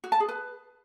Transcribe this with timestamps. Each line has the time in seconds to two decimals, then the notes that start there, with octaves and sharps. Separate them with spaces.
0.04 F#4
0.12 A5
0.20 G#4
0.29 B4